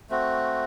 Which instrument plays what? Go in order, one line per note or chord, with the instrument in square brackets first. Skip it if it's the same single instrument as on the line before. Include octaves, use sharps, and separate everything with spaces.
[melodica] A3 C4 F#4